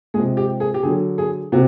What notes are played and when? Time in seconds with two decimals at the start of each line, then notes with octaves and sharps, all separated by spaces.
0.14 C3 F3 G#3 G#4
0.37 G4
0.60 G#4
0.74 G4
0.83 D3 F#3 G#4
1.18 G#4
1.52 C3 F#4